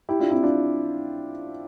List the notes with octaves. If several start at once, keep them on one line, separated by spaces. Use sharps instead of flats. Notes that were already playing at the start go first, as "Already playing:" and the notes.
E4 G4
D4 F4
C4 E4
D4 F4